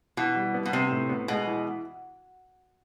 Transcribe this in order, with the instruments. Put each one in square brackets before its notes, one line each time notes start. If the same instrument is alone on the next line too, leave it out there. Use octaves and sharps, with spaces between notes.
[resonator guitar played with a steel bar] B2 [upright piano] E3
[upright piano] G3
B3
[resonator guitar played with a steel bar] B2
[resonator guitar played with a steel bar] C3 [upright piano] B3
[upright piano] A2
B3
[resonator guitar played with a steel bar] B2 [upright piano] G#3
[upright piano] E3